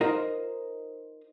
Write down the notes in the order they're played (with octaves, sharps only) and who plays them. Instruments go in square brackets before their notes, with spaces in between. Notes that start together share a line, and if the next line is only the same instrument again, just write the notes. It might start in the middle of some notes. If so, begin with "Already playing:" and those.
[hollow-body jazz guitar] D#4 F4 A#4 C5 D#5 F5